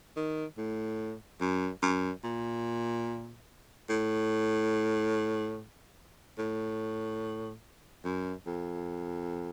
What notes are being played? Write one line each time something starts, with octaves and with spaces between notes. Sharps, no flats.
D#3
A2
F#2
F#2
A#2
A2
A2
F#2
F2